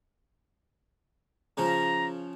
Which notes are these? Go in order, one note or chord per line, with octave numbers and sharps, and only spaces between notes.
C#3 F3 A#5